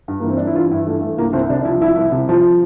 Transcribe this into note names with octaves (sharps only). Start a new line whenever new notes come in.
G2
E3 A#3
C4
G2 D4
E4
E3 F4
G2 E4
E3 A3
G2 A3
C2 A#3
C2 C4
C3 D4
D4
F3 E4
C2 E4
C2
C3
F3